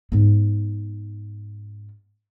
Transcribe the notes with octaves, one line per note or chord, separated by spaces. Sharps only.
G#2 B3